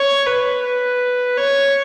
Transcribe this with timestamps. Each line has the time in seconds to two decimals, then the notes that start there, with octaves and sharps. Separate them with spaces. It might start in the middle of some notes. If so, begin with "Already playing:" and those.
Already playing: C#5
0.26 B4
0.63 B4
1.37 C#5